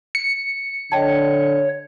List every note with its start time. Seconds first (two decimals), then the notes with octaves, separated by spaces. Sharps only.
0.15 C#7
0.92 D3 C#5 D#5 G5 A5